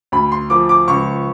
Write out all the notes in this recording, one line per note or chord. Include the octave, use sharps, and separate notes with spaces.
D2 B5
C6
F3 D6
D6
C#2 C#6